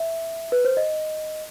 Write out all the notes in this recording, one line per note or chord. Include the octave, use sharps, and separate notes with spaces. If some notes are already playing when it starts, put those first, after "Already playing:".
Already playing: E5
B4
C5
D#5